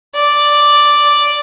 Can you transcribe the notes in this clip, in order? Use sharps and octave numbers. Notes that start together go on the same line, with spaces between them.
D5